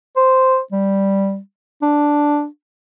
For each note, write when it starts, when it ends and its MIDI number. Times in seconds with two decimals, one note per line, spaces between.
0.16 0.60 72
0.72 1.39 55
1.82 2.46 62